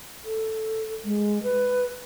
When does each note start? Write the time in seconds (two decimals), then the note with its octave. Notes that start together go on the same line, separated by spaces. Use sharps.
0.25 A4
1.04 G#3
1.43 B4